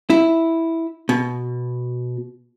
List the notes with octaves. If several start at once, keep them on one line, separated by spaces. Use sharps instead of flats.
E4
B2